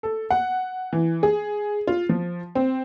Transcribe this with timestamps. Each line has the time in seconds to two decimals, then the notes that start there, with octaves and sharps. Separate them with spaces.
0.03 A4
0.30 F#5
0.93 E3
1.23 G#4
1.87 F4
2.09 F3
2.55 C4